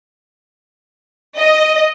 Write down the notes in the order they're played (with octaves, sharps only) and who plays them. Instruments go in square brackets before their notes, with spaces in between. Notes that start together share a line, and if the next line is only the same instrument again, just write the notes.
[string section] D#5